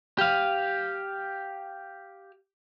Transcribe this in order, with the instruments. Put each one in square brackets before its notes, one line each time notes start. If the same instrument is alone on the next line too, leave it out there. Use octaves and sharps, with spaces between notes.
[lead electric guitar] G4 F5